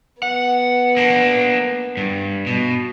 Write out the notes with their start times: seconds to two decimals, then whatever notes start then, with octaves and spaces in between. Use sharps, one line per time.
0.23 B3 F#5
0.97 A#3 D4
1.97 G2
2.47 B2